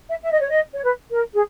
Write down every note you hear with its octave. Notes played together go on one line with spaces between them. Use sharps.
E5
E5
D#5
C#5
D#5
C#5
B4
A#4
G#4